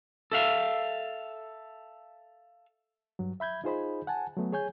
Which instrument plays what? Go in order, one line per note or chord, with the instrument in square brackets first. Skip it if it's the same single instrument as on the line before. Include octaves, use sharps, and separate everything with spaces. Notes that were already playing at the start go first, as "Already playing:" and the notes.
[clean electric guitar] A4 E5 F5
[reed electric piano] G2 F#3
E5 B5 G6 G#6
D#4 F4 G#4 C5 D#5 B5
F#5 G#5 A5
F#3 A3 B3
G#4 C#5 G#5 G6